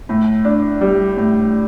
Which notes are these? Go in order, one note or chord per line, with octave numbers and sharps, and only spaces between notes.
A2
D4
G3
A2